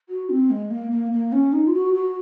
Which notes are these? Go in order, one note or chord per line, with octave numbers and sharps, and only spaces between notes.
F#4
C4
G#3
A#3
A#3
A#3
C#4
D#4
F4
F#4
F#4